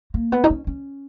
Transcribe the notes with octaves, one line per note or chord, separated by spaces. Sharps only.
A#3
B3
D#4
C#4
C#4